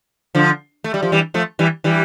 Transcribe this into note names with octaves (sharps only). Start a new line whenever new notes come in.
D3 F3
A3
G3
F3
E3 G3
F3 A3
E3 G3
E3 G3